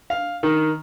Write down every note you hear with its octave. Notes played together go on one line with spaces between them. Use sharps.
F5
D#3